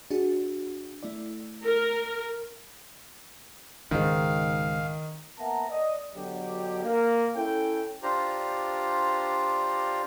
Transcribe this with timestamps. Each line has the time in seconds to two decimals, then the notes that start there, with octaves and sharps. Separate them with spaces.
0.10 D4 F#4 G#4
1.03 A3 E4 D5
1.63 A#4
3.91 C#2 G#2 D#3 F5
5.39 A#3 B3 E5 F#5 A5 A#5
5.70 D5 D#5
6.14 B2 D3 F#3 G4
6.84 A#3
7.36 C#4 E4 A4 G5
8.03 D4 F4 G4 C5 A#5